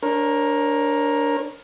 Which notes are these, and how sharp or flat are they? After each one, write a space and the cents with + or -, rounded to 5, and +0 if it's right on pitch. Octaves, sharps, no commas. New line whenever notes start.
D4 -15 A#4 +10 C#5 -30